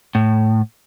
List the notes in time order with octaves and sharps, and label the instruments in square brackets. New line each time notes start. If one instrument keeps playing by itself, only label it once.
[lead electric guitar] A2